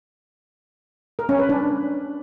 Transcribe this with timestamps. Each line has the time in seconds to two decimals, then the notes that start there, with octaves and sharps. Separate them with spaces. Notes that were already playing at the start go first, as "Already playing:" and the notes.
1.19 A#4
1.29 C#4
1.39 B4
1.49 D4